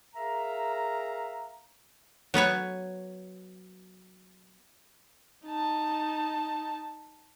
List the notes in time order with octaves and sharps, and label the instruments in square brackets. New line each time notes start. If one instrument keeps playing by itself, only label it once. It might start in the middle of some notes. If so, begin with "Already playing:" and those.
[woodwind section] G#4 A#4 E5 F5 A#5
[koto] F#3 B3 B4 C#5
[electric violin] D#4 A5